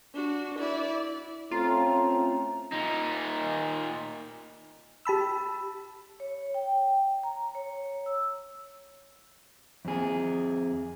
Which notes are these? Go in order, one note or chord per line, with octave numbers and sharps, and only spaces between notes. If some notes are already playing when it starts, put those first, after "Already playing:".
D4 F#4
E4 D5
A3 C4 C#4 F4 A#5
A#2 D#4
G4 A5 B5 E6
C#5
G5
A#5
C#5
E6
F2 G#4